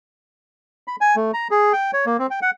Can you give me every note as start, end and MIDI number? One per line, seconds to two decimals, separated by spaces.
0.88 0.96 83
1.01 1.16 80
1.16 1.32 57
1.34 1.48 82
1.51 1.73 68
1.73 1.91 79
1.93 2.05 73
2.06 2.17 58
2.19 2.27 60
2.31 2.40 79
2.42 2.51 78